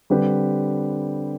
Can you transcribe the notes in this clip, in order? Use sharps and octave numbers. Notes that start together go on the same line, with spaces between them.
D3 G3 C4 G4 B4